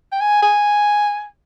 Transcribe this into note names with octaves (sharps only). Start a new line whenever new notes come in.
G5
G#5
G#5